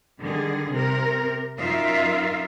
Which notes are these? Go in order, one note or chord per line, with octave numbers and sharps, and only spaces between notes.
D3 D#3 G3 G#4
C3 A#4
F#2 D#4 F4 A#4 E5 F5